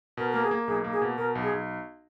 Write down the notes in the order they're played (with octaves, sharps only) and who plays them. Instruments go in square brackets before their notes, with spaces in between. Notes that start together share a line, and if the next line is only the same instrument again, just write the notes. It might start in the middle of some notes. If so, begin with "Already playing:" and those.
[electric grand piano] B2 [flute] A#4
[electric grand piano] A#3 [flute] A#4
[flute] G#4
[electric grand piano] A#3
[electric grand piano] B1 [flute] G#4
[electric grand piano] A#3
[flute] G#4
[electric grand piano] B2
[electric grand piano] B2 [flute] A#4
[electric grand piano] B1
[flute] G#4
[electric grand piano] B1